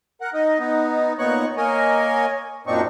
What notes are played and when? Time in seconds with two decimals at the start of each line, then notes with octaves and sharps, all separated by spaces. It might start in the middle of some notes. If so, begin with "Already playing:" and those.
0.21 A#4 F#5
0.34 D#4 D#5
0.59 B3 D#4
1.19 A#2 B3 D#4 C#5 C#6 F#6
1.57 A#3 A#4 C#5 D#5 G#5
2.67 F#2 A#2 C4 D4 D#4 C#6